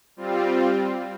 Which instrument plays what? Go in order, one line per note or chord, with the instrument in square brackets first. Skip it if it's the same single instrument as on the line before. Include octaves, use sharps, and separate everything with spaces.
[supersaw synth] G3 C4 F4